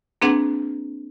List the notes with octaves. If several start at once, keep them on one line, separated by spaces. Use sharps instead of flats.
A#3 C4 D4 G#4 B4 F#5